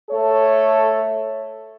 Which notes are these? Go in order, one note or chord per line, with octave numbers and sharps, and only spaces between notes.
A3 A4 C#5